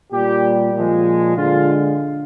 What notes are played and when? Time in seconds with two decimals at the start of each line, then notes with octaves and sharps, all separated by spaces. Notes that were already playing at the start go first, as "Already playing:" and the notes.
0.12 A#2 G3 G4
0.74 A#2 F3 G#3
1.36 D3 G#3 F4